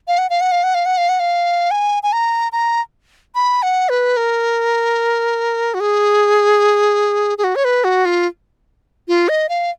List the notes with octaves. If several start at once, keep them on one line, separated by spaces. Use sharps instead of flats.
F5
F#5
F5
F#5
F5
F#5
F5
F#5
F5
F#5
F5
G#5
G#5
A#5
A#5
B5
F#5
B4
A#4
F#4
G#4
G#4
F#4
C#5
B4
F#4
F4
F4
D#5
F5